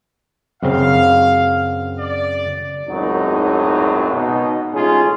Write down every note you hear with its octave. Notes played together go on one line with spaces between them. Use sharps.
F#2 C#3 C4 F5
D5
G#1 C#2 F#2 A2 F#3 D#4
B2 D#4
A1 G#3 C#4 F4 G#4